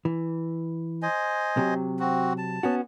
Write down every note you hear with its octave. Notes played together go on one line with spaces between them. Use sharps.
E3
C5 D#5 G#5
C3 F#3
C4 F#4
A5
B3 C#4 F#4